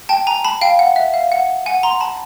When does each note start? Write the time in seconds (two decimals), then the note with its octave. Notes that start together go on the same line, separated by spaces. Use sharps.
0.09 G5 A5
0.27 G#5 A#5
0.44 A5 B5
0.61 F5 G5
0.79 F#5
0.96 E5
1.14 F5
1.32 F#5
1.66 F#5 G#5
1.83 A#5 C6
2.00 A5 B5